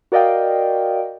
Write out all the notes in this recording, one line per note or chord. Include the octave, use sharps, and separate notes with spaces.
F#4 A#4 D5 D#5 F5 G5